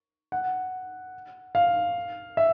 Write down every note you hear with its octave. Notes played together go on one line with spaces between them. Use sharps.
F#5
F5
E5